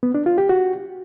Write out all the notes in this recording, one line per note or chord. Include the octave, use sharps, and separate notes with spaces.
B3
D4
F4
G4
F#4